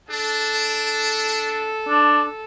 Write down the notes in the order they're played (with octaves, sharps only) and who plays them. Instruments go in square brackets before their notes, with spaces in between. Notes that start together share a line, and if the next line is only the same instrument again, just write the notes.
[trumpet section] D4 [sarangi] A4
[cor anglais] D4